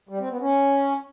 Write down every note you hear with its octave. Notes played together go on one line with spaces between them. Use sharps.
G3
C4
B3
C#4